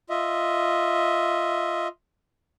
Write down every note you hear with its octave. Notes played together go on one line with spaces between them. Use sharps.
F4 D#5 E5